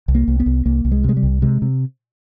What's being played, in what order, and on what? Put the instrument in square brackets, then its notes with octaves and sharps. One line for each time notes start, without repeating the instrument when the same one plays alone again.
[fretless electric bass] C2
A#3
C2
B3
C2
C2 A#3
C2
G#3
C3 G#3
G3
C2
C3 G#3
C3